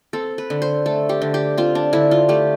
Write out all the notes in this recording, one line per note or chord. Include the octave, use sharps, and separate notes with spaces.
C4 A4
B4
D3
C5
A3 A4
G4
D3
G4
C4 F4
D4
D3 E4
F4
A3 G4